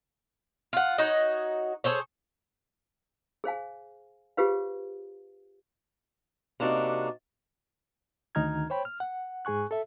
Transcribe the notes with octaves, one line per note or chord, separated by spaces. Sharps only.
F4 F#5
D#4 F#4 C#5 D#5
G#4 A4 C5 C#5
G#4 C5 F5 G#5
F4 G4 G#4 B4 C5 F5
C3 A#3 D4 D#4 F#4
D2 D#3 D#4 A#5 F6 G#6
C5 C#5 G5 B5
F6
F#5
G#2 G#4 G#5 C#6 F#6
A4 E5